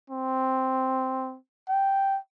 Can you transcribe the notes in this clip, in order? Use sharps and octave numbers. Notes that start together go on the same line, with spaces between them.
C4
G5